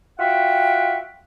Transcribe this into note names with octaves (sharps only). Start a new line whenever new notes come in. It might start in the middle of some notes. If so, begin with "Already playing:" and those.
F4 F#4 E5 F#5 G5